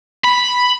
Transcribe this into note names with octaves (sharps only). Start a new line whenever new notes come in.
B5